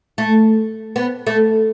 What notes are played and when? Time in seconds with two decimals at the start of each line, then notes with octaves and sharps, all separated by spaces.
0.18 A3
0.96 B3
1.27 A3